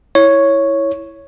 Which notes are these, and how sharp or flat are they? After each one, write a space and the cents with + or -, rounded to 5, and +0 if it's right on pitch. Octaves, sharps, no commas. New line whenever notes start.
E4 -5 C#5 +0